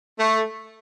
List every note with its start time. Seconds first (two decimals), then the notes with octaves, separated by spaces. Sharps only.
0.18 A3